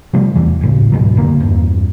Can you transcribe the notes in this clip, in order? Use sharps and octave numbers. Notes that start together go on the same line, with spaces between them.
C3 F3 G3 A3
D1 A#1 E2 E3
D1 G#1 A2 C#3
D2 G#2 B2 F#3
F#1 D#2 D3 A#3
E2 G2